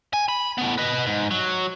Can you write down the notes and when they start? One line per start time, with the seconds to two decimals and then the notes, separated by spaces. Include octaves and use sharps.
0.13 G#5
0.28 B5
0.58 A2 B3
0.78 B4 D#5
1.06 G#2
1.31 F#3